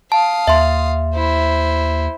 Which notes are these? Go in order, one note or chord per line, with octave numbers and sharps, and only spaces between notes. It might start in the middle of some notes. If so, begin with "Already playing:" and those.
F5 A5 D#6
D#2 E5 C6
E4 C5